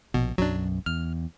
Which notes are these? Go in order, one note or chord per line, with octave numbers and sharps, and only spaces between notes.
A#1 B2
B1 F#2 F#3 D4
E2 F6